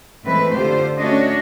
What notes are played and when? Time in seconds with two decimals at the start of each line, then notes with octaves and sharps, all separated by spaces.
0.24 A2 E3 G#3 C4 B4
0.54 D3 F4 G4 C5
0.99 A3 C#4 D4 F#4 C#5 D#5